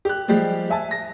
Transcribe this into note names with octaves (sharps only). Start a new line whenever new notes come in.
G4 F#6
F3 G3 G#3 G4
E5 G#5 A5
A#6